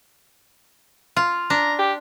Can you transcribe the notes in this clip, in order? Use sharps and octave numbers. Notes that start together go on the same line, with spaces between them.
F4
D4 A#5
G4